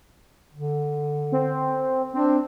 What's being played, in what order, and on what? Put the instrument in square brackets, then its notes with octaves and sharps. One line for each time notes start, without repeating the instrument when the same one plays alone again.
[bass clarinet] D3
[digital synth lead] C4
[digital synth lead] C4 [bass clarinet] D4